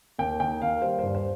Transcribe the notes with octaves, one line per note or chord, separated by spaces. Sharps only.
D#2 G5
D#3 G5
D#2 F5
G3 C5
G2 C5
C5